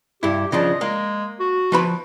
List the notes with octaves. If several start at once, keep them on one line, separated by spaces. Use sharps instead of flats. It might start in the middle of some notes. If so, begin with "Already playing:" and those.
G2 E4 G4
C#3 F3 D4 D#5
G#3 A#3
F#4
F3 B4 B5